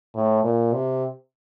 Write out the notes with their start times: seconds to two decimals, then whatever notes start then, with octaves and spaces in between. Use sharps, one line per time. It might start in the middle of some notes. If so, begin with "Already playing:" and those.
0.15 A2
0.44 A#2
0.73 C3